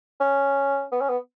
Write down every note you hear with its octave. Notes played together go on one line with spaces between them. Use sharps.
C#4
B3
C#4
B3